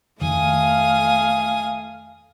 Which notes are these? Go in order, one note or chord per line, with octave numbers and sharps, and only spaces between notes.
F2 D#3 A3 F5 G#5 D#6